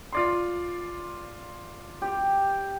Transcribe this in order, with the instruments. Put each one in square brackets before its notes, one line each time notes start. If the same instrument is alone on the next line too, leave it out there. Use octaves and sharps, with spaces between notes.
[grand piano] F4 D5 C6
[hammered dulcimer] G4